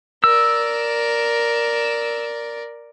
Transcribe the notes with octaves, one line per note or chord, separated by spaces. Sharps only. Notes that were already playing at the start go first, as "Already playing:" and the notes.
A#4 D5 E6